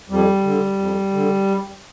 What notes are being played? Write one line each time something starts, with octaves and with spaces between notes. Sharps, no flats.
F2 G3
D3
F2
D3